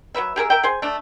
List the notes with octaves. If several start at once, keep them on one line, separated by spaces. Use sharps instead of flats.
F#3 A#3 B4 E5
G4 G#4 A#4 E5
A#4 E5 G5
G#4 C5 G#5
A3 D4